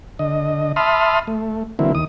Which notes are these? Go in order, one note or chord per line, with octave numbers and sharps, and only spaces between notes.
D3 D#5
E5 A5 B5 C6 D#6 F6
A3
D3 E3 F#3 A#3 C4 E4
D#2 D#6